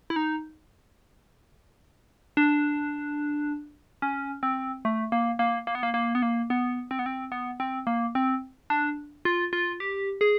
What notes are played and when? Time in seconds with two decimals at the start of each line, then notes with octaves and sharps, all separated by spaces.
0.10 E4
0.16 D#4
2.37 D4
4.02 C#4
4.43 C4
4.85 A3
5.12 A#3
5.39 A#3
5.67 A#3
5.75 B3
5.83 A#3
5.94 A#3
6.15 B3
6.22 A#3
6.50 B3
6.91 C4
6.99 B3
7.06 C4
7.32 B3
7.60 C4
7.87 A#3
8.15 C4
8.70 D4
9.25 F4
9.53 F4
9.80 G4
10.21 G#4